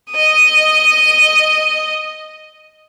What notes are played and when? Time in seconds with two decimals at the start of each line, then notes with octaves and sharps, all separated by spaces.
0.11 D#5 D#6